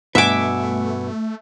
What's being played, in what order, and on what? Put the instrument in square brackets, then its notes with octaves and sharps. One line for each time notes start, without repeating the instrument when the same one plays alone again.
[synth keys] G2 B2 [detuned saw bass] A3 [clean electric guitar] B4 F#5 G#5 [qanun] E5 D6